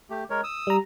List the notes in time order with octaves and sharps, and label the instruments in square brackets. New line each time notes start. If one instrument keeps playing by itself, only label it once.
[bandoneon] A3 G4
G#3 A#4 C#5
D#6 E6
[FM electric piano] G3 A#5